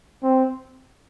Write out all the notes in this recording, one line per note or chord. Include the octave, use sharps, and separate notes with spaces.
C4